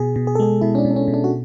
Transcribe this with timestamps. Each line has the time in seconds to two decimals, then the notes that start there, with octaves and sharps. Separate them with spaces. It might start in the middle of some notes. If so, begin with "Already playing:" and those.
Already playing: B2 G#4
0.16 B2
0.27 G#4
0.35 A4
0.40 G#3 G#4
0.61 B2 E4
0.75 C#4
0.78 D4
0.85 B2
0.91 D4
0.96 C#4
1.08 B2
1.14 D4
1.24 F#4